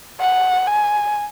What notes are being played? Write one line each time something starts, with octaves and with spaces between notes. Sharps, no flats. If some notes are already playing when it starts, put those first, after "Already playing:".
F#5
G#5